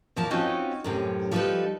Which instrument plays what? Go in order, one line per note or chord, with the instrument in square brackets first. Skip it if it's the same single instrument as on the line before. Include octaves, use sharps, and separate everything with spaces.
[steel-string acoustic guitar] E2 A#2 F3 A#4 A5
C4 C#4 D#4 F4 F#4
F#2 A2 C3 C#4
F3 G3 D#4 E4 A4 B4